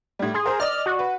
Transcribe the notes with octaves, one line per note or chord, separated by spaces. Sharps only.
A2 G3
G#4 C6
A#4 C5
D5 D#5 F6
F#4
B4